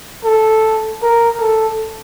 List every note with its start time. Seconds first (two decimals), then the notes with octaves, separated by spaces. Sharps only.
0.25 A4
1.03 A#4
1.41 A4